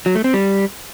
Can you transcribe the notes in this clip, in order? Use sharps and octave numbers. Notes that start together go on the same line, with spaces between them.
F#3
A3
C4
G3